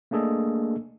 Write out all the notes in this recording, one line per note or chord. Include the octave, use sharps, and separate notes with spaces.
A3 A#3 D4 G#4 A4 D#5